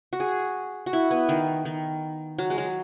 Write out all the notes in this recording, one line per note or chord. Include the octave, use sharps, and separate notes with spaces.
F#4
G#4
F#4
E4
B3
D#3
D#3
F#3
G#3
F#3